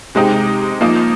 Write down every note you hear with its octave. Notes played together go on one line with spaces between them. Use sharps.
C3 G#3 C4 D#4
F3 A#3 D#4